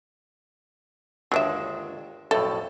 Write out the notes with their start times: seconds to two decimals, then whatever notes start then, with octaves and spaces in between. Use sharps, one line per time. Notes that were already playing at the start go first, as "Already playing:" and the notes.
1.32 G1 D#2 F#3 G#3 D4 E5
2.31 B1 F2 A2 A4 E5